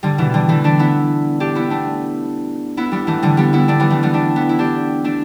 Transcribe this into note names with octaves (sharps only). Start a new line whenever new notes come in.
D3 G3
B2 E3
D3 G3
E3 A3
A3 D4
B3 E4
D4 G4
B3 E4
A3 D4
B3 E4
G3 B3
E3 A3
D3 G3
G3 B3
B3 E4
A3 D4
G3 B3
E3 A3
G3 B3
A3 D4
B3 E4
E4
D4 G4
A3 D4